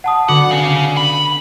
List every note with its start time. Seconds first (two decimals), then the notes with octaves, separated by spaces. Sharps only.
0.04 F#5 A5 D#6
0.29 D3 B3 F#4 F#5 D6
0.51 C#3
0.97 B5